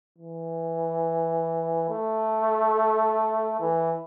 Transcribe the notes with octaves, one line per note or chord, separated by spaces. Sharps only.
E3
A3
E3